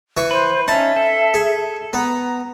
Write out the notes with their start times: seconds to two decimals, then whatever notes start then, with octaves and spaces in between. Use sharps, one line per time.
0.17 E3 C#6
0.31 B4 C5
0.68 C#4 D#4 E5 A5
0.96 A4
1.34 G#4
1.93 B3 A#5